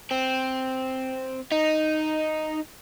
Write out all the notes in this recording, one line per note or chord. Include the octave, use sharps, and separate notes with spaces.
C4
D#4